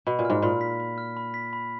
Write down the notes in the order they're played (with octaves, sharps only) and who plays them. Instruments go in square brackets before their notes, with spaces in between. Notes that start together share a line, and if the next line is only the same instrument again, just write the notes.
[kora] B2 [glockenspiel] B5
[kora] A#2
[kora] G#2 [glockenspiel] F6
[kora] A#2 [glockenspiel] B5
[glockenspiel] B6
B5
F6
B5
B6
B5